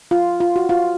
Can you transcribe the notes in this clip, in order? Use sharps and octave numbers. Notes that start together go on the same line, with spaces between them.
F4
F4
F#4
F4